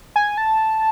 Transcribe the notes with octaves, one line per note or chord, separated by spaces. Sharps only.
G#5
A5